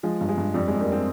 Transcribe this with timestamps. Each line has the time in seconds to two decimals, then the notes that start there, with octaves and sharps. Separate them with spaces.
0.03 F3 G#3
0.21 G2
0.28 G#3
0.37 G2
0.54 F2 G3
0.68 G#3
0.72 F2
0.80 G3 A#3
0.92 G#3 C4